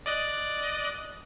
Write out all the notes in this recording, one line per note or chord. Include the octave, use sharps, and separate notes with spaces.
D5 D#5 F#6